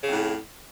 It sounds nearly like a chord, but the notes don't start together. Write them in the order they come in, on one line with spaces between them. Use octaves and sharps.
C#3 F2 A2